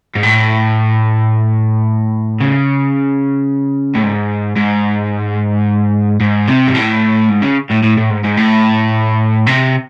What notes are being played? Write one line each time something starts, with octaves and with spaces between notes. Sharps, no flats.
G#2
A2
C#3
A2
G#2
G#2
G#2
C3
G#2
A2
G#2
C#3
A2
A2
A2
G#2
G#2
A2
C3